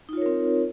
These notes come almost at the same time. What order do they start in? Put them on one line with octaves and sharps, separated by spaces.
D#4 F4 C#5 A#4 C4